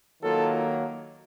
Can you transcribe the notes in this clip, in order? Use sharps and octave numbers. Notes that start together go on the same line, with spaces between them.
D#3 F#3 A#3 F4 A4